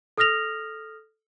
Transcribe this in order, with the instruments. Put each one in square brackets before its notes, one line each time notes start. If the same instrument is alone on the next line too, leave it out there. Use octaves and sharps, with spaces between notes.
[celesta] A4 D#6 F6 A#6 F7